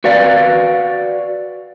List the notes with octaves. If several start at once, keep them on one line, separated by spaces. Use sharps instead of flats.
F#4 B4 D5 F5